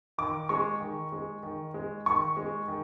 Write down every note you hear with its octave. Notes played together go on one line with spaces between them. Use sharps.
D#3 D6
G#3 C#6
D#3
G#3
D#3
G#3
D#3 C#6
G#3
D#3